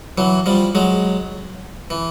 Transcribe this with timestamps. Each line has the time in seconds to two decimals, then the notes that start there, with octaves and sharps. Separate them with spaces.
0.18 E3 F#3
0.46 F3 G3
0.75 F#3 G#3
1.90 E3